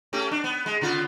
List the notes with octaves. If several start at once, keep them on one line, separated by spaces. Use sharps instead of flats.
A3 C#4 G4
D4
B3
G#3
C#3 B3 F4